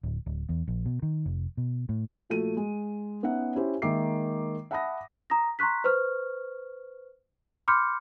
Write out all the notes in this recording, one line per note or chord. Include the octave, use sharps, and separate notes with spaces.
D1
D1
E2
A#1
B2
D#3
F1
B2
A2
A#2 F3 A3 F#4 D#7
G#3
B3 C#4 D#4 E5 F#5
C#4 E4 G4 C5
D#3 G#3 A#3 E5 D6 C7
E5 F#5 A5 B5 D#6 A#6
A#5 D#6 A#6
A#5 C6 C#6 F#6 B6
B4 C5 C#6 F6
B5 C6 D6 F6 G6 C#7